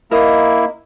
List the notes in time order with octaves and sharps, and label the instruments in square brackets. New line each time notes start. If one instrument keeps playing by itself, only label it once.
[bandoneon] A#3 E4 [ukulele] A#4 D#5